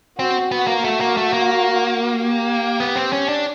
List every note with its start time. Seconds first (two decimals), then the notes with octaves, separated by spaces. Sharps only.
0.19 C4 F#4
0.51 B3
0.67 A#3
0.84 A3 F#4
1.01 A#3
1.17 A3
1.33 A#3
2.15 G4
2.80 B3
2.96 C4
3.13 C#4
3.29 D4